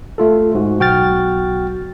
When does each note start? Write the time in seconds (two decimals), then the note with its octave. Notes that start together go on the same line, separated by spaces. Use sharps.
0.18 A3 F4 A4
0.55 G#2 F#4
0.80 B1 F#4 G5 F6 A6